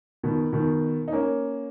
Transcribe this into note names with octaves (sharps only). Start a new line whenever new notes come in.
B2 D#3
B2 D#3
D#4
A#3 C#4